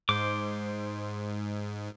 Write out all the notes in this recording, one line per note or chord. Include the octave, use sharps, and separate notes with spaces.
G#2 C5 D6